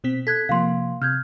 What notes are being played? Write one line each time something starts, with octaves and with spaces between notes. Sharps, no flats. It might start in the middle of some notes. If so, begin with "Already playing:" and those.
B2 C4 B6
A4 F#6 G#6 B6
C3 F3 A#3 F5 C6
C3 F6 G6 G#6